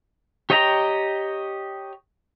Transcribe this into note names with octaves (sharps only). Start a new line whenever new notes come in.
G4 C#5 D#5 G5 A#5